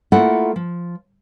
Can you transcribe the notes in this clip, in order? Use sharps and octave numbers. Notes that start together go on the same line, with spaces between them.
A3 A#3 E4 F4 A4 F#5
F3